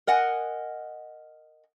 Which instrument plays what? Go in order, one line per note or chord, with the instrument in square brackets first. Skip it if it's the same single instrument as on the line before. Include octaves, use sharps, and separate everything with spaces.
[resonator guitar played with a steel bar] A#4 D#5 F#5 G#5